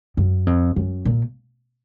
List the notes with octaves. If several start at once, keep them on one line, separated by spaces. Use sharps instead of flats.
F#2
F2
F#2
A#2